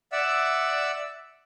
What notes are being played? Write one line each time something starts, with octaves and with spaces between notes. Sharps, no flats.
D5 E5 F#5 E6